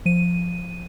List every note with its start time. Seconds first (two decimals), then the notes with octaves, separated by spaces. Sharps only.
0.06 F3 D#7